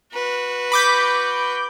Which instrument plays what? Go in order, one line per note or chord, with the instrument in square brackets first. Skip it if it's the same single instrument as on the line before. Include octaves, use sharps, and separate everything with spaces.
[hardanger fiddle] F#4 B4
[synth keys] B5 D6 G6